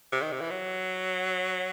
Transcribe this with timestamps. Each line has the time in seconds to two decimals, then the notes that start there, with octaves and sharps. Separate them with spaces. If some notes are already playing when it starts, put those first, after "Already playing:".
0.13 C3
0.22 D#3
0.32 C3
0.41 E3
0.51 F#3